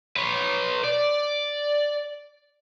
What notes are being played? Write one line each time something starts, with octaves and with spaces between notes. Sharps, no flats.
B4 C#5
D5